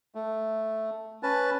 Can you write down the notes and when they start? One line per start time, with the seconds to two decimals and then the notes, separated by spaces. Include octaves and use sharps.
0.15 A3
1.23 C#4 B4 A5